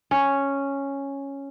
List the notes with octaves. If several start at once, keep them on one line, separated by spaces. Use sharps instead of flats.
C#4